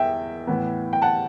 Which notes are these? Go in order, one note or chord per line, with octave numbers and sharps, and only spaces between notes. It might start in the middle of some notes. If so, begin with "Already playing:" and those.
Already playing: E2 E5 G5
A2 E3 B3
G5
F#5 A5